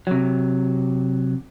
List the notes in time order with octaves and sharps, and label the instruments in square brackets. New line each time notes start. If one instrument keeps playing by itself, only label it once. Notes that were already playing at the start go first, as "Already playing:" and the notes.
[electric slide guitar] C3 F#3